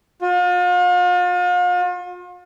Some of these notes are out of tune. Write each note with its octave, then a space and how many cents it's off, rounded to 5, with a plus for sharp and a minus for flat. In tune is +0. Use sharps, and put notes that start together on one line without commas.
F4 +40